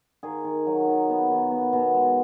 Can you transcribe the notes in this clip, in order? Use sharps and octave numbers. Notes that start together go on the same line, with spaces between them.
D#3 G#4
D#3
F#3
D#3
B3
D#3
B3
B2
G#3